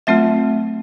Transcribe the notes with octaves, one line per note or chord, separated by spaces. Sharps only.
F#3 A3 C4 F4 E5